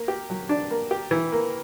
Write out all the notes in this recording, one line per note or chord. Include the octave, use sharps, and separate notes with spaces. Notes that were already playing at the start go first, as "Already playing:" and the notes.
Already playing: A#3
G4
F#3
D4
A#3
G4
E3
A#3